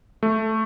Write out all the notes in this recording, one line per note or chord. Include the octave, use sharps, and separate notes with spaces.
A3